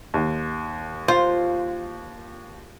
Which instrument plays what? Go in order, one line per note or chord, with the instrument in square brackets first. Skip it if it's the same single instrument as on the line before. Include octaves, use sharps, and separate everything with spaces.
[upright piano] D#2
[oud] F4 [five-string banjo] C5